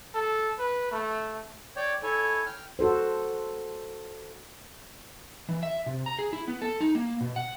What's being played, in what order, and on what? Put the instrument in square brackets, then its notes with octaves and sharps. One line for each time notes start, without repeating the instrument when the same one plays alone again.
[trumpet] A4
B4
A3
[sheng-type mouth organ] C#5 D5 G5
E4 A4 C#5 G#5
G5 F6
[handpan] F#4 A4 C5
[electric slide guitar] E3
E5
C3
A#5
G#4
E4
B3
A4
D#4
A#3
B2
F#5